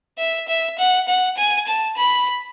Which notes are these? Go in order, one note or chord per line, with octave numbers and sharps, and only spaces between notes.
E5
E5
F#5
F#5
G#5
A5
B5